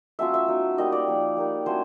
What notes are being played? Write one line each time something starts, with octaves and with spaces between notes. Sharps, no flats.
F#3 A3 C#4 F4 E5
E5
F#3 B3 D#4
G3 A#3 D#4 D#5
D5
F3 A#3 D#4
G3 A#3 D#4
F#3 A3 C#4 E4 C5